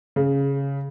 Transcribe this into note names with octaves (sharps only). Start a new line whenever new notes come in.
C#3